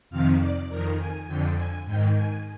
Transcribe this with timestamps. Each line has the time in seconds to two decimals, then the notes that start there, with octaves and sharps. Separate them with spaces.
0.10 F2 C3 D#3 F5
0.40 D5
0.69 F2 D#3 A#4
0.98 G#5
1.27 F2 D3 G5
1.56 G#5
1.85 G#2 D#3 G5
2.14 G#5